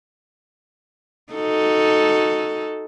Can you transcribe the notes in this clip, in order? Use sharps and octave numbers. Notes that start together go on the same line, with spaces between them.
D#4 F#4 A4